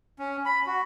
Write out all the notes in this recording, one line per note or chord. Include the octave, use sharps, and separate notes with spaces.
C#4
B5
F#4